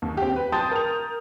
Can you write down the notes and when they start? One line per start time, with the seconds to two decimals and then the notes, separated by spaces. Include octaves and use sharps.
0.02 D#2
0.17 C4 G4
0.36 B4
0.52 G5 A5 C6 D#6 G6 A6
0.71 A#4 F7